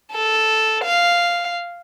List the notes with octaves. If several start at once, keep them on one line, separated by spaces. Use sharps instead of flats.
A4
F5